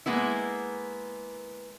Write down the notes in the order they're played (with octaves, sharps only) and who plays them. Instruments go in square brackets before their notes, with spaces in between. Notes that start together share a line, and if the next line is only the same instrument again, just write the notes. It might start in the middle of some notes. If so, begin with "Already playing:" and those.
[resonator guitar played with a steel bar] G#3 A#3 B3 E4